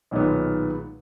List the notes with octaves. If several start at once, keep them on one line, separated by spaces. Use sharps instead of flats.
B1 A#2 D#3 G#3 B3